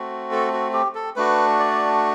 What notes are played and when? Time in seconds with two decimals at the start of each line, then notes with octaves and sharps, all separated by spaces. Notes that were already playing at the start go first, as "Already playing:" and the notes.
Already playing: A3 C4 F#4
0.32 A4
0.53 F#4
0.73 G4
0.95 A4
1.16 A3 D4 F#4 B4
1.60 D5